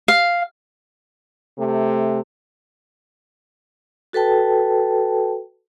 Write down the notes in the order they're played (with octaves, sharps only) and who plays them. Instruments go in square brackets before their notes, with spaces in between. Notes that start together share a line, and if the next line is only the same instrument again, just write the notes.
[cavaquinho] F5
[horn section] C3 A3
[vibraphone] F#4 A4 B4 G5 A5